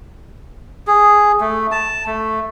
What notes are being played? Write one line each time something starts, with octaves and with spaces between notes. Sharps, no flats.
G#4
A3
A5
A3